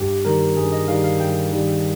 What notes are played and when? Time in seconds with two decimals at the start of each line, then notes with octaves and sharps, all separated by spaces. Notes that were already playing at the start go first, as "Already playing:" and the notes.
Already playing: G2 G4
0.25 D#3 G3 A#4
0.57 G2 G#4
0.72 D#5
0.88 D#3 G3 F5
1.04 F5
1.20 G2 G5
1.52 D#3 G3